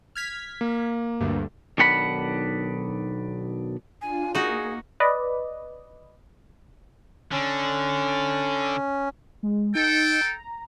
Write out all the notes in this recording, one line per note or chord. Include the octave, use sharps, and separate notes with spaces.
F6 G#6 B6
A#3
D2 G2
B1 D#3 D4 F#5 B5
D4 F4 G#5
A#3 D#4 F#4 G#4
B4 D5 D#5
D3 C#4
G#3
D#4 A4 G5
A#5